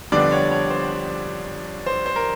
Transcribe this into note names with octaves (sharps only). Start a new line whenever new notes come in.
F2 D3 G3 B3 D4 D5
C#5
C#5
C5
C5
C5
A#4